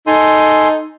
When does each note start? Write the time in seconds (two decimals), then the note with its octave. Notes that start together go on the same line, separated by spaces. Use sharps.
0.07 D#4 A4 G#5 C6